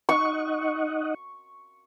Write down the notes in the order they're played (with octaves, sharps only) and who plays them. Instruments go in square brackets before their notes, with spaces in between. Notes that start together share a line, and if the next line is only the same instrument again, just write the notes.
[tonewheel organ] D#4 D#5 F#5 [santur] C#6